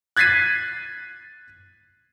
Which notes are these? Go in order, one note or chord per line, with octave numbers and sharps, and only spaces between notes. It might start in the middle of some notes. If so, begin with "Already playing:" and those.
F#6 G#6 A6 B6 C7 D#7